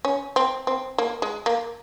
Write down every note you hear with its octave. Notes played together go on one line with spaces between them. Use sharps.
C#4
C4
C4
A#3
G#3
A#3